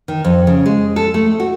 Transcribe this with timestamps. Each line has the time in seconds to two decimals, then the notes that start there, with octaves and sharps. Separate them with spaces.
0.08 D#3
0.24 F2
0.47 C#3
0.66 G#3
0.96 A4
1.14 A3
1.40 F#4